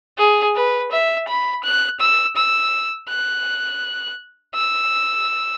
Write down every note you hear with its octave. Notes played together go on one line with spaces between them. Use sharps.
G#4
B4
E5
B5
F#6
E6
E6
F#6
E6